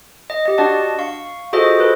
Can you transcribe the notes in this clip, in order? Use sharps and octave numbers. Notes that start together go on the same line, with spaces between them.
D#5
G4 D#5
D4 F#4 D5 D#5 F#5 A5
F5 C#6
F4 F#4 G#4 A4 C5 D#5
A4 B4 C5